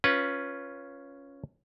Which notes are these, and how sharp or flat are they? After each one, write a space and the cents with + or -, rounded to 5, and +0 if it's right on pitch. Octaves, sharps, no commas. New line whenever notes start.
C#4 +0 F4 +5 B4 -10